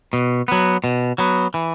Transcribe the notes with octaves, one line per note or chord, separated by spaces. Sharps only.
B2
F#3 B3
B2
F#3 B3
E3